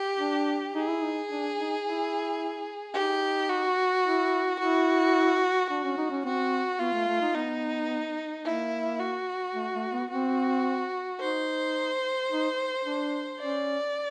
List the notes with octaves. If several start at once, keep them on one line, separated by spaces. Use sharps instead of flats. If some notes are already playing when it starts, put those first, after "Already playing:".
Already playing: G4
D4
D#4 G#4
E4
D#4
D4
D#4
E4
D#4 G4
F#4
E4
E4 F#4
D4 F#4
C#4
D#4
C#4
C4 F#4
B3 F4
A3
A3
D#4
B3 D#4
A#3 E4
F#4
A3
A3
B3
C4 F#4
D#4 C5
D#4
D4
C#4 D5